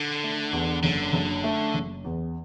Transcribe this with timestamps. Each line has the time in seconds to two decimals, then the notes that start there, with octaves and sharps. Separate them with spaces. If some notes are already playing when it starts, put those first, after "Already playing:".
Already playing: D3
0.23 A3
0.53 E2
0.83 F#1 D3
1.13 F#1
1.44 A3
1.74 F#1
2.04 E2